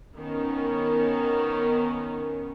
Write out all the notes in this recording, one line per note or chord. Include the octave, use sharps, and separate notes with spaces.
D#3 B3 C#4